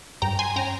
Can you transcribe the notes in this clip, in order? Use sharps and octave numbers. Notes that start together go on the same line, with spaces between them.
G2 G5 A#5
G#5 C6
C#4 G5 A#5